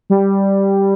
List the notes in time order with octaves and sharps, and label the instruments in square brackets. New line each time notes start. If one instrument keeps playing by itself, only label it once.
[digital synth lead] G3